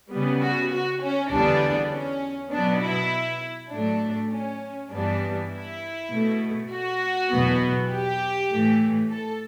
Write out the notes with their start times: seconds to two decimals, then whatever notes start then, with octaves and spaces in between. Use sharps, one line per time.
0.12 C#3 G3 B3
0.42 F#4
0.72 F#4
1.02 C#4
1.31 E2 D3 G3 B3 D4
1.91 C#4
2.52 B2 F#3 B3 D4
2.81 E4
3.71 A2 F#3 A3 D4
4.32 C#4
4.91 G2 E3 G3 B3 D4
5.52 E4
6.11 B2 A3
6.71 F#4
7.31 E2 B2 F#3 B3
7.91 G4
8.51 A2 E3 A3
9.11 A4